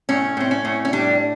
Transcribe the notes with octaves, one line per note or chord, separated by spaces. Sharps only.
A2 C#4
A2 C4
C#4
A2
C#4
G3 D4